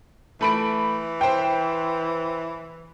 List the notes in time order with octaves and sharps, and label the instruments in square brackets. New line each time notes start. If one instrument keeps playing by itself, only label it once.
[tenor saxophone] E3 [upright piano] A3 B5 D7
[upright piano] C5 G5